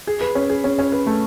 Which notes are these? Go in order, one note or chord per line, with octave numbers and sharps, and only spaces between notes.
G#4
B4
C#4
G#4
C#4
C#4
B4
A3